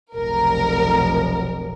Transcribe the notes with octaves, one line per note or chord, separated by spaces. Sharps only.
F1 B1 A#4